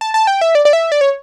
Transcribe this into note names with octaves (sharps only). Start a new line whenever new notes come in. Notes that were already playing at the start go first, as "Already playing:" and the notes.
A5
A5
G5
E5
D5
D5
E5
D5
C#5